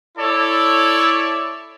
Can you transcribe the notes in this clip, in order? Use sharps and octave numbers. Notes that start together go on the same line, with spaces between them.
E4 A4 C#5 D5